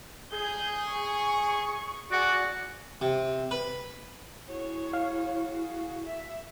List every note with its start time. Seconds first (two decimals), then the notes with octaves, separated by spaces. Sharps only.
0.32 G#4 G6
0.90 C#6
2.11 F#4 G#4 D5 F#5
3.01 C3
3.51 B4
4.48 E4 F#4 G#4 C#5
4.93 F5
5.46 G#4
6.06 E5